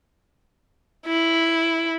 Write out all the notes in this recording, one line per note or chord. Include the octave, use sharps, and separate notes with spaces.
E4